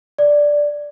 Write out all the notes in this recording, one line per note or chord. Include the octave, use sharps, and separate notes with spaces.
D5